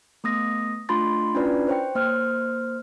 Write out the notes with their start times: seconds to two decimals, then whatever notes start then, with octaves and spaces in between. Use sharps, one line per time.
0.24 A3 B3 D#6 A#6
0.89 A3 D4 F4 B5 C6 A6
1.35 C#4 D4 E4 F4 B4 D5
1.68 C5 C#5 G5
1.95 A#3 C5 F6